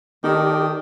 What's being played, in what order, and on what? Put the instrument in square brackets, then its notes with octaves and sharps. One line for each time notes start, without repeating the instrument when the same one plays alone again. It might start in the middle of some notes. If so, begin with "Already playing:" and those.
[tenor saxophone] D#3 [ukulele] D#4 [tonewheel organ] G4 A4 D5